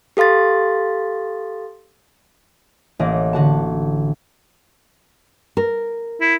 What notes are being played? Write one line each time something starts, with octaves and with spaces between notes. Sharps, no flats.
G4 A4 F5 C6 A6
A1 A#3 D#5
D3 F#4 A5
A#4
E4